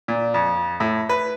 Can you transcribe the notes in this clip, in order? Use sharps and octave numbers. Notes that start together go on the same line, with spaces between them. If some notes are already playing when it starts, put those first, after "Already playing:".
A#2
F2
A2
B4